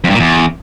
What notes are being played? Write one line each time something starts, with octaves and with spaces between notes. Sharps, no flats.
F2
G2
A#2
E2